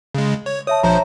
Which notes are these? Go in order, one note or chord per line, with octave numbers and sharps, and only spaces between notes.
C#3 G#3
C#5
C#5 E5 A5 D#6
A#1 F3 C5 A#5